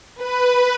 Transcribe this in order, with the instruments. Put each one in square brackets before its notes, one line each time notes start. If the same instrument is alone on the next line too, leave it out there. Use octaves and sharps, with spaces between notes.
[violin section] B4